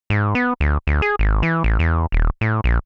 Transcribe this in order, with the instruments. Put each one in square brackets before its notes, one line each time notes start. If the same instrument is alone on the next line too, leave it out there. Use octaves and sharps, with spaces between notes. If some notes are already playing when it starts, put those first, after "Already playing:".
[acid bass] G#2
B3
D2
D2
G#4
G#1
E3
A1
E2
D#1
A2
A#1